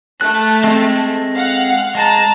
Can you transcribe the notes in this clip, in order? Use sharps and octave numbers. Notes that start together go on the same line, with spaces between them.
A3 F#6
G#3 C4 A4
F5 F#5
G#3 A5 A#5